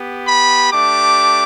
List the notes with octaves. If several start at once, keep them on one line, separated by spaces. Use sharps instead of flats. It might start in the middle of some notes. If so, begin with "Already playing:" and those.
Already playing: B3 G4
B5
A3 D4 G4 D6